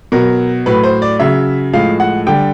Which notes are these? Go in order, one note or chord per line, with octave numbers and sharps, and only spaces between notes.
B2 F#3 A#4
A2 F#3 B4
C5
D5
C#3 F#3 E5
A2 F3 G#3 F5
F#5
D3 G3 G5